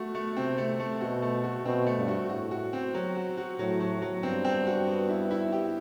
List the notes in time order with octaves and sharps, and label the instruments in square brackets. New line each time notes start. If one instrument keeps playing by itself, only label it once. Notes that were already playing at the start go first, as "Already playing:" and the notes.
Already playing: [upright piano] A3 F#4
A3
[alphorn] C3 [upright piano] C4
[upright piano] A3
A3
[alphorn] B2 [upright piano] F#4
[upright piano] A3
F#4
[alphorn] B2 [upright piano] C4
[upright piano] A3
[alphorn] G2
[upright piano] F#4
[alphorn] A2 [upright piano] F#4
[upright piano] F#4
C4
F#3
F#4
F#4
[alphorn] A2 [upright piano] F#3
[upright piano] F#3
F#3
[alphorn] G2 [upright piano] C4
[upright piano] C4
F#4
B3
E4
E4
G4